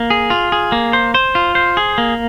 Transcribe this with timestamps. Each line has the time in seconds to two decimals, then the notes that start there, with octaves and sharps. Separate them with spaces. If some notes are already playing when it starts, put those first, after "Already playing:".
Already playing: A#3
0.10 G#4
0.30 F4
0.52 G#4
0.72 A#3
0.93 C5
1.14 C5
1.35 F4
1.55 C5
1.77 G#4
1.98 A#3